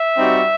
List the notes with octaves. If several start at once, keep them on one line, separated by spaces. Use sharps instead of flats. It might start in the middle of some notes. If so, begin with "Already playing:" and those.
Already playing: E5
G3 C4 D#4 F#4